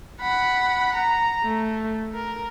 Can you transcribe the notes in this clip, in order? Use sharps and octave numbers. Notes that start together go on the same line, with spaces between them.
F#5 B5
A#5
A3
A#4